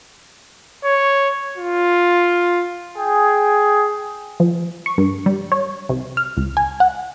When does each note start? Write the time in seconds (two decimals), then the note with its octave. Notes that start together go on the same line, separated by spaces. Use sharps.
0.84 C#5
1.57 F4
2.97 G#4 G5
4.40 F3
4.86 C#6
4.98 G2
5.26 G3
5.52 C#5
5.89 C2
6.17 F6
6.37 C#2
6.57 G#5
6.80 F#5